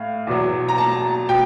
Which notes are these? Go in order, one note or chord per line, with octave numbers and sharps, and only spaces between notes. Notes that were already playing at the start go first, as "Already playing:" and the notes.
Already playing: A2 F5
E2 B2 F#3
A#5
A5
B2 G5